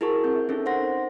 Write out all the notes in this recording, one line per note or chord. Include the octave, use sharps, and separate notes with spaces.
E4 F#4 G#4 A#4 A5 C#6
C4 G6
E5
C#4 D#4 A4 A#4
C5 F#5 C6 A#6
C5